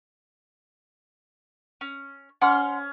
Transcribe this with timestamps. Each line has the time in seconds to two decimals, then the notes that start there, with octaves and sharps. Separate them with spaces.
1.81 C#4
2.41 C#4 F#5 C6 F6